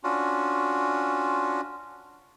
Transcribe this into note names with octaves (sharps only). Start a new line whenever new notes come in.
C#4 D4 F4 F#4